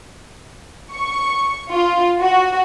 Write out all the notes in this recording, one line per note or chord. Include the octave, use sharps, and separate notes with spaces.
C#6
F4
F#4